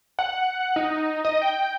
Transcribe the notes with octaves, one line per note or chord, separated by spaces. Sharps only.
F#5
D#4
D#5
G5